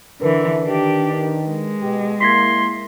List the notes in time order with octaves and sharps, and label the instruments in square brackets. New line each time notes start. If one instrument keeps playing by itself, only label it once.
[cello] D3 E3 [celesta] A#4 B4
[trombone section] D#3 [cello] D4 G4
[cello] G#3
[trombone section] B2 G4
[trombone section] A#3 E4 [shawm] C6 [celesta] G#6 A#6 B6